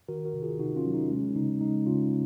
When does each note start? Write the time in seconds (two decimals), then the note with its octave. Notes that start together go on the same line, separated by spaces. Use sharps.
0.09 D#3 F#4 A#4
0.25 F#4 A#4
0.34 C3
0.43 F4 G#4
0.59 C3 D#4 F#4
0.76 C#4 F4
0.85 F#3
0.94 D#4
1.10 G#3 C#4
1.36 C#3 D#4
1.61 G#3 D#4
1.87 C#3 C#4 F4